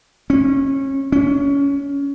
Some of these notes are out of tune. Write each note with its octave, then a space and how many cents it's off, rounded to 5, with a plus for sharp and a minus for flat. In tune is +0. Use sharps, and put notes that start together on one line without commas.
C#4 -25
C#4 +20